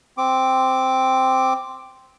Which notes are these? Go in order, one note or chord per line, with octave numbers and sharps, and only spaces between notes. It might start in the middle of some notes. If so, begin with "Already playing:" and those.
C4 D6